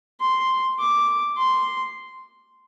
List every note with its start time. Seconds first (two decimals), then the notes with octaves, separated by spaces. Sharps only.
0.21 C6
0.79 D6
1.38 C6